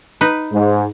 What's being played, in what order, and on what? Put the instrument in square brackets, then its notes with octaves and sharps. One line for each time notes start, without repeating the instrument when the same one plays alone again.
[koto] D#4 B4
[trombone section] G#2